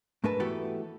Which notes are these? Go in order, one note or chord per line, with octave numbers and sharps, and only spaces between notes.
G#2 A3 D4 A#4 B4 A5
E3 A3 B3 F#4 G4 A4